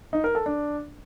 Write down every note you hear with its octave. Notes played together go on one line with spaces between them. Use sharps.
D#4
A#4
A4
D4